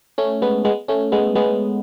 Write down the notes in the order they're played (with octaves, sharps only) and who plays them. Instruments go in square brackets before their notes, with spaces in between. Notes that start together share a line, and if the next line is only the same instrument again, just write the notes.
[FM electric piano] A3 C#4
G#3 B3
G#3 B3
A3 C#4
G#3 B3
G#3 B3